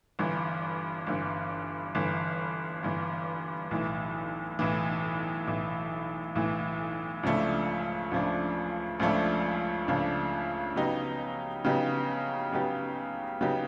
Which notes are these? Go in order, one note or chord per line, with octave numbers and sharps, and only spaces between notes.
G1 G2 E3
G1 G2 E3
G1 G2 E3
G1 G2 E3
B1 A2 E3
B1 A2 E3
B1 A2 E3
B1 A2 E3
C#2 C#3 F3 A3 D4
C#2 C#3 F3 A3 D4
C#2 C#3 F3 A3 D4
C#2 C#3 F3 A3 D4
C#3 F#3 B3 D#4 G4
C#3 F#3 B3 D#4 G4
C#3 F#3 B3 D#4 G4
C#3 F#3 B3 D#4 G4